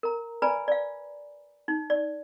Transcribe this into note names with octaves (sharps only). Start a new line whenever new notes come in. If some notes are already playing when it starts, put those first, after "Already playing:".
A#4 A#5
B4 D5 G#5 A#5 B5
D5 F5
D#4
D5